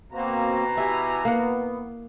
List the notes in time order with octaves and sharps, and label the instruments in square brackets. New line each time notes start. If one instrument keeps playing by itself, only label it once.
[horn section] B2 A#5 [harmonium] A#3 C4 F#4
[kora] E4 [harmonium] G4 E5 G#5
[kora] A#3 F#5 [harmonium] B3